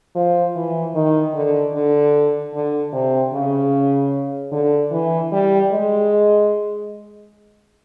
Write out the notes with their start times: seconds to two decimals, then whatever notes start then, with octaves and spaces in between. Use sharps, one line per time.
0.15 F3
0.56 E3
0.95 D#3
1.34 D3
1.74 D3
2.54 D3
2.93 C3
3.33 C#3
4.52 D3
4.91 E3
5.32 G3
5.71 G#3